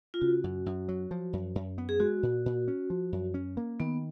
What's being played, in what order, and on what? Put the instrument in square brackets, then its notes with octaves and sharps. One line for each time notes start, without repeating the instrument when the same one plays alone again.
[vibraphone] F4
[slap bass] C#3 [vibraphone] F#4
[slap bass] F#2
F#2
F#3
F3
F#2
F#2
B3
[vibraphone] G#4
[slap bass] G#3 [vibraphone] F#4
[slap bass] A#2
A#2
C#4
F3
F#2
C#4
A#3
[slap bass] D#3 [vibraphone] B3